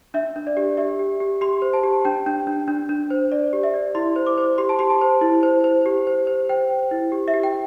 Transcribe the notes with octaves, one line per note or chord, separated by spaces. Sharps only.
D4 E5
D4
D5
G4
G4 E5
G4
G4
G4 C6
C5
A5
G4
D4 G5
D4
D4
D4
D4
C5
D5
G4
E5
D5
E4 C6
C5
D6
C5
G4 C6
A5
G4 C6
A5
C5
E4
C5
C5
G4
C5
C5
C5 G5
C5
E4
G4
E5
G4
G5